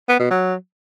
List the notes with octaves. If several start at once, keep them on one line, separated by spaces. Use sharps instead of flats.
B3
B2
F#3